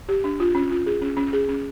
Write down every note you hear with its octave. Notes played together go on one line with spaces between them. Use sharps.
G4
D4
F4
C#4
F4
G#4
C#4
C#4
G#4
C#4